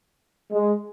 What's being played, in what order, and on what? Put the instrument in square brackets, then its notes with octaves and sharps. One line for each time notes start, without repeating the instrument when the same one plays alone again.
[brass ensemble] G#3